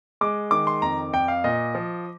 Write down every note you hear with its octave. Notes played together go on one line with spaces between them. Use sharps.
G#3 D6
D#3 D6
C6
F2 A#5
F2 G5
F5
A#2 D#5
F3